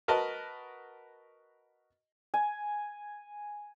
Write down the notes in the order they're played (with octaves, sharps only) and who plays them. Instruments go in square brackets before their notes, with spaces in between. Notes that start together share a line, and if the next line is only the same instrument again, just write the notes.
[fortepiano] F#4 A#4 B4 D#5 A5
[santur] G#5